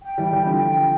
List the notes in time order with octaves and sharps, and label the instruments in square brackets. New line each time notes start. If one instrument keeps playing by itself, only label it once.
[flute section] G5
[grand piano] E3 G3
[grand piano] E3 G3 [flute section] G5
[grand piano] D3 F3
[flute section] G5